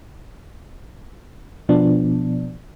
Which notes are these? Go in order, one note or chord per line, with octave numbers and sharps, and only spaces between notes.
B2 F3 B3 D4